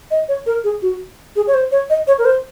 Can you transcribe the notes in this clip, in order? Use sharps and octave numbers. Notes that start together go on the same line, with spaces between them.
D#5
C#5
A#4
G#4
F#4
G#4
C#5
C5
C#5
D#5
C#5
A#4
C5